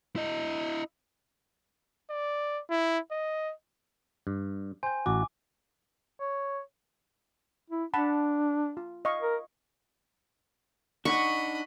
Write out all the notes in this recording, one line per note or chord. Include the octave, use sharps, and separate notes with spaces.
E4 D#5
D5
E4
D#5
G2
C5 G5 G#5
A1 F#4 D6
C#5
E4
D4 F#5 A5 B5
F4
D#5 F5 C#6
A#4
D4 D#4 D#5 F#5 B5 C#6